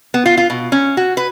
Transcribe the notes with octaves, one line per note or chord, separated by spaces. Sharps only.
B3
F4
F4
B2
C#4
F#4
B4